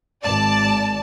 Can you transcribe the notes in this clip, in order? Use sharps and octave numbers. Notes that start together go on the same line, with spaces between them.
G#1 D5 A5